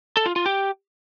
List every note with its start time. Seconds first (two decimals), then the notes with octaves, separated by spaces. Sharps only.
0.17 A4
0.26 F4
0.36 F4
0.46 G4